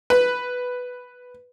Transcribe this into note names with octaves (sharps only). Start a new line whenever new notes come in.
B4